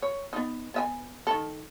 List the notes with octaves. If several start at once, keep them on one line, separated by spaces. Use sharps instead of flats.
C#5
B3 D#4
B3 E5 G#5
D#3 A4